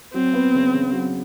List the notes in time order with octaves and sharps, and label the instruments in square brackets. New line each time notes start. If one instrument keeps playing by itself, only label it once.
[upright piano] F#3 [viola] C4
[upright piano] B3
C#3
C#3
F#3